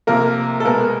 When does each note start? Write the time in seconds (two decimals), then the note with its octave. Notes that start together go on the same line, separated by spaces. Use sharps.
0.07 C3 F3 A#3 A#4
0.60 A4
0.65 B2 G#3 B3 A#4